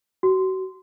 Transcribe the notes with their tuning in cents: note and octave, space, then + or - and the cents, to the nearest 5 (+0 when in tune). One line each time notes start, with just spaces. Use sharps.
F#4 +35